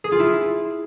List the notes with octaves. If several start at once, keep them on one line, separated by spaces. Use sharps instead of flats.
G#4
F4
E4